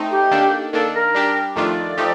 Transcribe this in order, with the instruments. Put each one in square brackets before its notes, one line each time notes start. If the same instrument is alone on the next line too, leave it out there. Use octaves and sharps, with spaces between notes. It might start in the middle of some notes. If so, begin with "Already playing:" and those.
Already playing: [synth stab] A3 C4 D#4
[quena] G4
[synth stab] D#3 A#3 D4 A4
[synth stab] D#3 A#3 D4 [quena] A4
[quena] A#4
[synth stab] G3 D4 G4
[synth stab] F2 D#3 A3 D4 F4 [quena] D5 D#5
[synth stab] F3 A3 D#4 G4